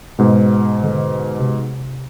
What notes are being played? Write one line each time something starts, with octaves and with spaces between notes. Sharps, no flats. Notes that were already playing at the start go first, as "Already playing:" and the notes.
G#2 B2
D3
C3